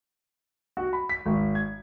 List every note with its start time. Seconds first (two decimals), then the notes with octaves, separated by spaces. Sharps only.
0.77 F#4
0.93 B5
1.09 B6
1.26 G#1
1.55 G#6